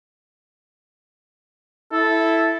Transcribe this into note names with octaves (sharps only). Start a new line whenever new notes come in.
E4 A4